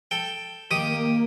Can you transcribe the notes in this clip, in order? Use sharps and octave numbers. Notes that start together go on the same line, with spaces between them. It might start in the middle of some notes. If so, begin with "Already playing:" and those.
A4 G5
D#3 A#3 G4 D#6